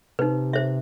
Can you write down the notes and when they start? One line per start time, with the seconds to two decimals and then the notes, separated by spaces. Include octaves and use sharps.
0.19 C3 D#4 B4
0.53 C5 E5